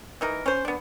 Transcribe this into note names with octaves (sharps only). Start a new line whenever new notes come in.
E3 D#4 A#4
C#4 C5
B3 D4